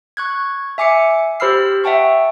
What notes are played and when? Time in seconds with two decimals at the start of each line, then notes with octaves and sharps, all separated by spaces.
0.17 C#6 F#6 G#6
0.78 E5 G#5 D6 C7 C#7
1.40 G4 C5 B5 E6 F6 C7
1.84 E5 F#5 G5 A5 C#6